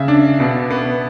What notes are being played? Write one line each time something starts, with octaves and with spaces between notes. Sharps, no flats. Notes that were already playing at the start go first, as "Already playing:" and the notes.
Already playing: C#3 E5
D4
B2
B3